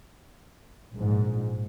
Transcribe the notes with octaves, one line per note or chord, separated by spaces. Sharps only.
A#1 G#2